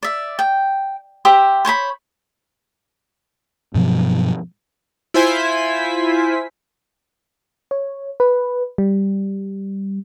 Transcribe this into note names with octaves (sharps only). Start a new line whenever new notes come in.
D5 E5
G5
G4 C5 E5
C5 C#5 G5 B5
G2 B2 F3 F#3
E4 F4 C5 G#5 B6
C#5
B4
G3